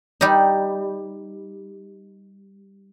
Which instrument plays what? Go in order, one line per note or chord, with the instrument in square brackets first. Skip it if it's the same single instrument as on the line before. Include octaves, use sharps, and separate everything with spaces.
[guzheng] G3 D#4